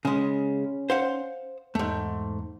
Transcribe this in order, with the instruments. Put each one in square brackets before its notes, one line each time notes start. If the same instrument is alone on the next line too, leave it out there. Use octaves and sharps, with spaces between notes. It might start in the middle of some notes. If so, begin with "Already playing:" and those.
[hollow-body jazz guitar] C#3 G#3 [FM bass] C#4
[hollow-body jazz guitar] C5 F5 F#5
[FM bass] E2 [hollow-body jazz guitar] G#2 A3